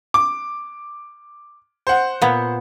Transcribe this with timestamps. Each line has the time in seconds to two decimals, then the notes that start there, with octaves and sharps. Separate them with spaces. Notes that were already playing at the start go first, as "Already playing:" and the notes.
0.14 D6
1.87 C5 F#5
2.22 A#2 B3